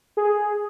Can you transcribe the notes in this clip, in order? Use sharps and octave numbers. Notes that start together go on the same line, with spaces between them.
G#4